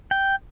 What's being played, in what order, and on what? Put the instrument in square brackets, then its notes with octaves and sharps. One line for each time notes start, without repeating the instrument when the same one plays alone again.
[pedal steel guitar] G5